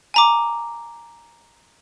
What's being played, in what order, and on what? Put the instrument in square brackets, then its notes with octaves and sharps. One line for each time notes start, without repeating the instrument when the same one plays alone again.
[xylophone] G#5 A#5 D6